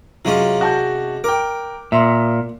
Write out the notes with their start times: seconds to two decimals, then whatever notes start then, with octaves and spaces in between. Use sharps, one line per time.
0.25 C3 F#3 G#3 C#4 F4
0.61 F#4 A5 G6
1.24 A#4 G5 D6
1.92 A#2 E5 C6